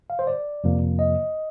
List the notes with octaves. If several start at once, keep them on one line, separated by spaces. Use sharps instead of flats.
F5
C5
D5
F2 C3 F3 A#3
D#5